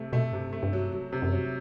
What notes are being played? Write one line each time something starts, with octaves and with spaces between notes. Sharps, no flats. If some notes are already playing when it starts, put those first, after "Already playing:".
Already playing: C3 A3
B2 A3
G2 C3
A3
G2
F#3
F#3
C3
F#2
F#3